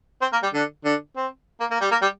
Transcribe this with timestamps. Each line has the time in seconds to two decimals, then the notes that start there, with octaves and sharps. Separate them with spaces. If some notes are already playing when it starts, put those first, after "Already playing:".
0.22 C4 C5
0.33 A#3 A#4
0.43 G3 G4
0.54 D3 D4
0.85 D3 D4
1.17 C4
1.60 A#3
1.71 A#3
1.81 G3 G4
1.91 A#3 A#4
2.02 G3 G4